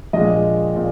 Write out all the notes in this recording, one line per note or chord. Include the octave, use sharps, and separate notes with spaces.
A#1 A#2 G#3 D#5
A#2